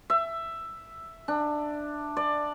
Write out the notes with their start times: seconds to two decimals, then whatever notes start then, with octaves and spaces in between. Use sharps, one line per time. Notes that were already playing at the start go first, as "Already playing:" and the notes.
0.10 E5
1.28 D4
2.17 D5